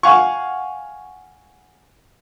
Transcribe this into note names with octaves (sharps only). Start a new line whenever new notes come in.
F5 F#5 G#5 C#6